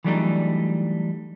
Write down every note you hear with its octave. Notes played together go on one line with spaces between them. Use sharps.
E3 F#3 G3 A3 D4 D#4